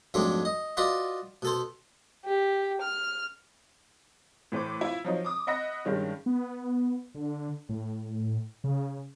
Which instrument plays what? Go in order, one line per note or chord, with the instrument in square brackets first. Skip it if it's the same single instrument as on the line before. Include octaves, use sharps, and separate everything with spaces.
[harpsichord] F2 G#2 F#3 A3 C4 D4
D#5
F4 F#4 B4 D5 D#5 F#5
B2 A4 C5
[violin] G4
F6
[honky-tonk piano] A2 E3 B4 C5 D6
E4 F4
F3 F#3 D#4
D6 D#6
D#5 E5 F#5 B5 A#6
G2 D#3 G#3 C#4
[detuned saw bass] B3
D3
A2
C#3